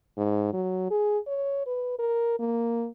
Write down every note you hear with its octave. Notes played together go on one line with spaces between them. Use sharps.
G#2
F#3
G#4
C#5
B4
A#4
A#3